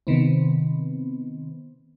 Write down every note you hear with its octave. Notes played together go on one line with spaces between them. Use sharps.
C3 D#3 B3 C4